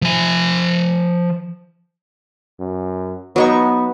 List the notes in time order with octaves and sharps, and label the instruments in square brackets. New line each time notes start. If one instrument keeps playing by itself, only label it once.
[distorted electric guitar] F3 G#5
[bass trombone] F#2
[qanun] F#3 D#4 C#6 [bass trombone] B3